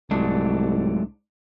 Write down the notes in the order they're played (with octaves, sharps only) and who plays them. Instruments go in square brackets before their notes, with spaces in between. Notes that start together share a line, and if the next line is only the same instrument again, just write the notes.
[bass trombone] C2 [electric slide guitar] G#2 D4 [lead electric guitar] F#3 A3